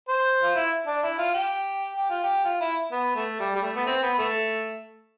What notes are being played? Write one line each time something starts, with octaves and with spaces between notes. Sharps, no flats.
C5
F4
E4
D4
E4
F4
G4
G4
F4
G4
F4
E4
B3
A3
G3
G3
A3
B3
C4
B3
A3